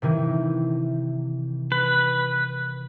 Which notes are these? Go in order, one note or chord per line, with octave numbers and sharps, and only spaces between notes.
C3 D#3 E3
B4